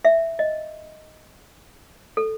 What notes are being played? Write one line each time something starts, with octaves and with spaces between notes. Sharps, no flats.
E5
D#5
A4